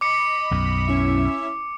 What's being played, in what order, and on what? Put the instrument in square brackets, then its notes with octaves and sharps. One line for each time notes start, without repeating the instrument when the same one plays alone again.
[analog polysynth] D#5 B5 [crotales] D6 C#7
[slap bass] B1 F#2
[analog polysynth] C#4 E4 E5